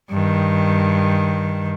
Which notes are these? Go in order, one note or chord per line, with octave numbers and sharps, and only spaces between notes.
G2 D#3